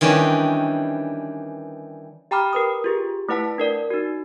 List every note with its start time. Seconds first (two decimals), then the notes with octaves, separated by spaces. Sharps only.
0.01 D#3 E3 G3 C#4 D4
2.31 G4 G5 A#5 B5 D6 F6
2.53 A#4 B4 D#6
2.84 F4 G4 G#4
3.29 A3 E4 B4 F#5 A5 B6
3.58 D4 A#4 D5
3.90 D#4 F#4